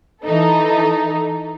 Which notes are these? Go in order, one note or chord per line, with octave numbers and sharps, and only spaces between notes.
E3 D#4 A4